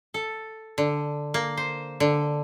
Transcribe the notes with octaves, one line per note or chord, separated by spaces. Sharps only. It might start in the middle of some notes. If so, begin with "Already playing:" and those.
A4
D3
A#3
C5
D3